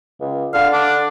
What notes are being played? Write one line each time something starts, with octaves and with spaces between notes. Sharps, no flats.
C#2
D3 F5
D4